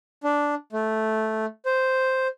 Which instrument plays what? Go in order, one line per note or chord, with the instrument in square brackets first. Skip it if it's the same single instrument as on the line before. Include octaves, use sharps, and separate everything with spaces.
[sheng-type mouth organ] D4
A3
C5